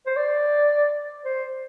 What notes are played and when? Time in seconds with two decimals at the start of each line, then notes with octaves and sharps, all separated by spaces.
0.07 C5
0.17 D5
1.25 C5